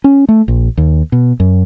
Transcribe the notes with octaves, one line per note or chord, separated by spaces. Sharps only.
C#4
A3
A#1
D#2
B2
F#2